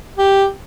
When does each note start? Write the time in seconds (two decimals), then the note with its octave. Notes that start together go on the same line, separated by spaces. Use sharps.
0.18 G4